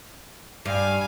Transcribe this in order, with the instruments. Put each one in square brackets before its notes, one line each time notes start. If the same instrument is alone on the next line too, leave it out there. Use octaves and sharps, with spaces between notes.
[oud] G2 [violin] F5 G#5